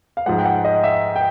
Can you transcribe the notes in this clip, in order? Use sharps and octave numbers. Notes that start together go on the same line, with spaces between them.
F5
G#2 F3 G#3 F#5
G5
F#5
D#5
E5
G5